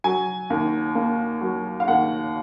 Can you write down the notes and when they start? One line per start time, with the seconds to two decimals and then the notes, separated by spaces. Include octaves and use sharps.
0.04 F#3 G#5
0.50 D#2
0.95 A#3
1.41 F#3
1.80 F5
1.88 D#2 F#5